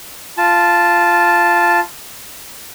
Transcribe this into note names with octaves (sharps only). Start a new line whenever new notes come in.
F4 A5